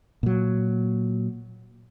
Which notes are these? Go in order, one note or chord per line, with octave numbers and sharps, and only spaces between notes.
A#2 F#3